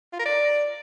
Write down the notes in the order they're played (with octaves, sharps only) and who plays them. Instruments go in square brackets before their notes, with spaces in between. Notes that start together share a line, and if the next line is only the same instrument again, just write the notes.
[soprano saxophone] F4
A#4
D5